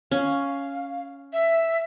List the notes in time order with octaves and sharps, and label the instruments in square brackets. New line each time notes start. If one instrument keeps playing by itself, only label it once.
[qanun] C#4 [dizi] F5
[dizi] E5